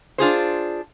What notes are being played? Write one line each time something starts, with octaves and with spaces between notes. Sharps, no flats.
D4 F4 G#4 C5